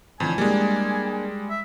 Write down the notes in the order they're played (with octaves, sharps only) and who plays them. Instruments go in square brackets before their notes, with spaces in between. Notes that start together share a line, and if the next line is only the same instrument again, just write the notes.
[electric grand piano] F2 [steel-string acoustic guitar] A2 D3 E3 [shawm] G#5
[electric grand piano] G3 G#3 [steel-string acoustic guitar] A#3 D4
[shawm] E5